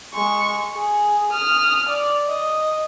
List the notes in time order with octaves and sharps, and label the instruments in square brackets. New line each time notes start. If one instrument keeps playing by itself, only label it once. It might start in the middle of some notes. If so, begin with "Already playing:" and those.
[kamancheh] G#3 C#6
G#4
D#6 F6
D5
D#5